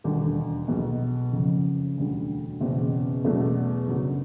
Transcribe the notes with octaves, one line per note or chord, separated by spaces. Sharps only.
E1 D#2 D3 G3
B1 B2 G#3 B3
F#1 F2 C#3 F3
E1 D2 D3 G3
F#1 E2 B2 G#3 C4
E2 B2 F#3 A3
F#1 F#2 D3 F#3